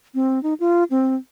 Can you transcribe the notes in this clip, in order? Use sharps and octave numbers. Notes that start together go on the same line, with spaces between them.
C4
D#4
F4
C4